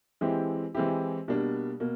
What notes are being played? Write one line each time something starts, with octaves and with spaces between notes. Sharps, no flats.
E3 G#3 C4 E4 G4
E3 G#3 C4 E4 G4
B2 G3 A#3 D4
B2 A#3